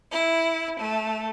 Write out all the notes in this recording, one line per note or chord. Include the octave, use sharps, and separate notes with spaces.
E4
A3